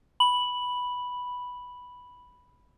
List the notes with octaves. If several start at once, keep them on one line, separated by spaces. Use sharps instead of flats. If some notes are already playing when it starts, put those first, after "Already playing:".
B5 F#7